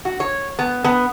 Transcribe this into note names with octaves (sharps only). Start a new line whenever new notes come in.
F#4
C#5
B3
B3